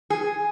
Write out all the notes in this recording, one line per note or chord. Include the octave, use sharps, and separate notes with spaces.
G#4